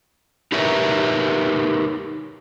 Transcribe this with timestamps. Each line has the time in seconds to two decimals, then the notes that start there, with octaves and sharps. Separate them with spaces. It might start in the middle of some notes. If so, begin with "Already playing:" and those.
0.52 D#4 G4 A#4 B4 C#5 E5